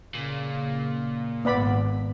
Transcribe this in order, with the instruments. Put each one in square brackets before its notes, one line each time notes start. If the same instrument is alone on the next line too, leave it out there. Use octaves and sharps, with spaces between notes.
[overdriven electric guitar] A#2 [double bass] C#3
[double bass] G#1 [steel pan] B3 D5 B5